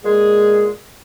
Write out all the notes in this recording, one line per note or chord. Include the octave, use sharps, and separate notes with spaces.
A#2 G#3 G#4